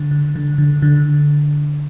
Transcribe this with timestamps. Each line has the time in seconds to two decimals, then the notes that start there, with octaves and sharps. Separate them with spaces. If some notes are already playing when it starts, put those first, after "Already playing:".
Already playing: D3
0.11 D3
0.36 D3
0.58 D3
0.82 D3